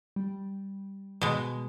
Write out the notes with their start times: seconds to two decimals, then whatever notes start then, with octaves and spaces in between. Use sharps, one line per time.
0.16 G3
1.22 B2 G#3